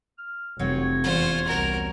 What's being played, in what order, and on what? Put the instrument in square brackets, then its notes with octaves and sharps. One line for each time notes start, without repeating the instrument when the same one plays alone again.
[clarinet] F6
[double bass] F1 [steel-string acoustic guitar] F#3 C4 [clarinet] C#5
[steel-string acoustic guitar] E2 C#4 F#5 [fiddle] F4 C5
[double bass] C2 [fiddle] F#4 A#4